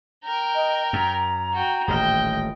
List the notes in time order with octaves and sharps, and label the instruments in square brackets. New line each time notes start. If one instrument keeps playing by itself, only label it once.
[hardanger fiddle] A#4 G5
[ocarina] D#5
[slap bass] F#2 [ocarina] A#5
[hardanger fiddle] F#4 G5
[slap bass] D#1 A1 [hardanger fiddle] D#5 G5